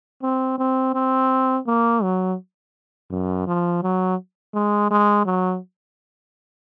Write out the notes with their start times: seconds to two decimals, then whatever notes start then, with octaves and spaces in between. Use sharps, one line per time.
0.23 C4
0.58 C4
0.94 C4
1.67 A#3
2.03 F#3
3.10 F#2
3.47 F3
3.83 F#3
4.54 G#3
4.91 G#3
5.25 F#3